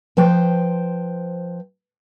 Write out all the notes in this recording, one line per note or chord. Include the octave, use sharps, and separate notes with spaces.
F3 B4 C5 G5